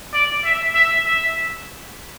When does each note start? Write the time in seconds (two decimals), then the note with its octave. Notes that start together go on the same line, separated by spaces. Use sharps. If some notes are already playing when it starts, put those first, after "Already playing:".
0.13 D5
0.45 E5
0.75 E5
1.06 E5